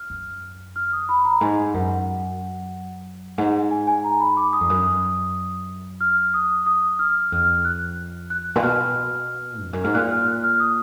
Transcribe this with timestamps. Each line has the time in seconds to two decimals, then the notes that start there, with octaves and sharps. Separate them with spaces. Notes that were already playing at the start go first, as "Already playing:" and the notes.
Already playing: F6
0.10 F#2
0.76 F6
0.93 D#6
1.09 B5
1.25 A#5
1.41 G#2 G#5
1.74 F#2 F#5
3.38 G#2 F#5
3.71 G#5
3.87 G#5
4.04 A#5
4.20 B5
4.37 D6
4.53 D#6
4.61 F2
4.70 F#2
6.01 F6
6.34 D#6
6.66 D#6
6.99 F6
7.32 F2 F6
7.65 F#6
8.30 F#6
8.55 A#2
8.63 B2 F6
9.62 F2
9.73 F#2
9.84 G#2 F6
9.94 A#2 F#6
10.11 F6
10.27 F#6
10.44 F6
10.60 D#6